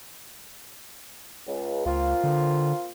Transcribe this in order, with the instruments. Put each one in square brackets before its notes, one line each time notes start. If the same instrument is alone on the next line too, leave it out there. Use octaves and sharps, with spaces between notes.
[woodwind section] C#2
[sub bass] C#2 [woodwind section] A#3 C4 F4
[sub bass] D3